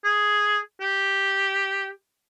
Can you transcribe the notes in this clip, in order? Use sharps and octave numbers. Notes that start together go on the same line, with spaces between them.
G#4
G4